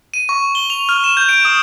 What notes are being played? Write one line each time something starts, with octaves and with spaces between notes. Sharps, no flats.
D#7
C#6
G7
F7
F6
E7
G6
D7
D#6